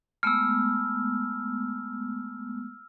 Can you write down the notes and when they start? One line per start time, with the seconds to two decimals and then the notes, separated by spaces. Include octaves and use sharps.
0.23 G#3 A3 B3 E6 F6